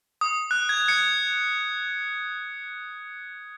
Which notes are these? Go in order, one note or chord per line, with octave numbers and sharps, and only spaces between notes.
D#6
F#6
G#6
G#6 C#7